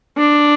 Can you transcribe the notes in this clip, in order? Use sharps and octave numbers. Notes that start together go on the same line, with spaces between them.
D4